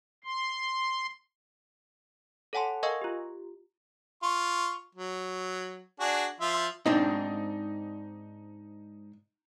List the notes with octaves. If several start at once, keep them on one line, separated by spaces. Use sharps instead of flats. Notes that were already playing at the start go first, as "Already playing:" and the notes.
C6
A4 C#5 F#5 G#5 A5 C6
A#4 D#5 F5 G#5 C#6 E6
F4 G4
F4 C#6
F#3
D4 F#4 G#4
F3 F4 E5
G#2 C4 D4 D#4